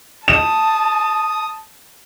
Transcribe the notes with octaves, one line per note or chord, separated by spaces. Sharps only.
A5 D#6 E7